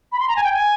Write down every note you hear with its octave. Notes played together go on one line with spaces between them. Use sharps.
B5
C6
A#5
G#5
G5
G#5